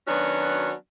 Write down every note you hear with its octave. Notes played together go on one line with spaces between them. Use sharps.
D#3 F#3 B3 C#4 D4 F#4